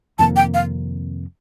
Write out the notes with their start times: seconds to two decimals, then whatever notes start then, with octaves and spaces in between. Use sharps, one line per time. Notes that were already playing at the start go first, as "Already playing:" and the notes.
0.19 F2 C3 D#3 A#3 A5
0.36 G5
0.54 F5